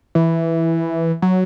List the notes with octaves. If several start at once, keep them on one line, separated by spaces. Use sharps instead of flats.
E3
F#3